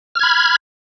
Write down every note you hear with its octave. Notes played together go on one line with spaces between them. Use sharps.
B5 F6 G#6